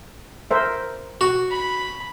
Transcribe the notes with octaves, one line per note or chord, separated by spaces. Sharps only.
A#4 C5 E5
F#4
B5